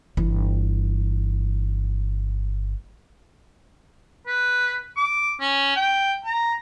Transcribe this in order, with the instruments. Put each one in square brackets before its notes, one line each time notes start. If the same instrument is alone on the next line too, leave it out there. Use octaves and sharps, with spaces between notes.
[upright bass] G1 E3
[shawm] B4
D6
C#4
G5
A#5